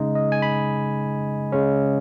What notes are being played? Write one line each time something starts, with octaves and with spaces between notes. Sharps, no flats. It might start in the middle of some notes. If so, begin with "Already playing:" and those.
Already playing: C#3 G#3 D#4
D#5
G#5
B5
C#3 G#3 C#4